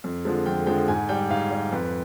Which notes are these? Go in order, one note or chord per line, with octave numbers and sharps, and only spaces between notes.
F2
D3 F3 G#3
F2 G5
D3 F3 G#3 G5
G#2 G#5
G3 G5
G#2 F5
G3
F2 B4